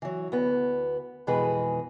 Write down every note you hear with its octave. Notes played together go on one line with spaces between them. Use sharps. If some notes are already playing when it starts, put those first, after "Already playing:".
E3 F#3
D2 B3
F2 B2 E3 G#3 G#4 B4